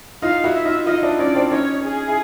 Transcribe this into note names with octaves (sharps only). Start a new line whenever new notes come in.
D#4 F4 F5
E4 F#4
E5
D#4 F4
D#4 F4 D#5
D4 E4
C#4 D#4 D5
C4 D4
C#4 D#4 C#5
G#4
E4